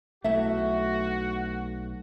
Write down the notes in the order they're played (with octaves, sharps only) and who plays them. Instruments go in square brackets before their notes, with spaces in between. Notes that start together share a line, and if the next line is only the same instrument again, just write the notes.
[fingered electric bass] B1 A3 [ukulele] E4 E5 [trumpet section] F#4